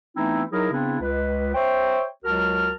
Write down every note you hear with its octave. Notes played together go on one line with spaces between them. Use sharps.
E3 A3 B3 C4 D#4 E4
F#3 D#4 E4 G#4 A#4
C#3 B3 C4 D4 E4
C#2 B4
C5 C#5 E5 G5
C#2 F#3 F#4 A#4 A5 F6